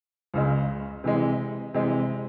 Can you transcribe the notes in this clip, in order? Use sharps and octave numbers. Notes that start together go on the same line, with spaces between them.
C#2 C#3 G#3
C3 E3 G#3
C3 E3 G#3